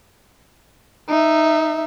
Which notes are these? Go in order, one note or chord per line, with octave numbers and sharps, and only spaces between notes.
D#4 E5